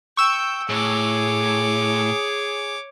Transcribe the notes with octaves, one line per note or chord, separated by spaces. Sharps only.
G5 C#6 E6
A2 G#4 C#5 D6